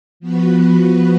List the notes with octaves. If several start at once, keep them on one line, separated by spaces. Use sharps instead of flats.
F3 B3 F#4 B4